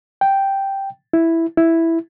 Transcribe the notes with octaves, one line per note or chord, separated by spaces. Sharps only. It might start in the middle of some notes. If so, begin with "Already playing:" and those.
G5
E4
E4